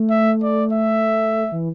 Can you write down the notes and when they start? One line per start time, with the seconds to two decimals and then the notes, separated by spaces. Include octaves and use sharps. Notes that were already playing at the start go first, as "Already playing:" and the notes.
Already playing: A3
0.10 E5
0.42 D5
0.73 E5
1.52 E3